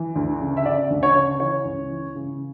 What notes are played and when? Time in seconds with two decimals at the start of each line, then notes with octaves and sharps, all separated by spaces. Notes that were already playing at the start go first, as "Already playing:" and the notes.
Already playing: E3
0.16 D2
0.40 C#3
0.57 E5
0.65 C#3 D5
0.90 D2
1.03 C#5
1.15 C#3
1.40 E3 C#5
1.65 C#2
1.91 E3
2.15 C#3